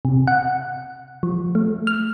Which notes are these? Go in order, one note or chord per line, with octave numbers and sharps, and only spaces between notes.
C3
F#5
F3
A3
F6